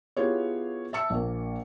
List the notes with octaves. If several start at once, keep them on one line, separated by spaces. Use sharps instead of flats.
B3 E4 F4 G4 G#4 C#5
E5 A5 E6 C#7
A#1 A#3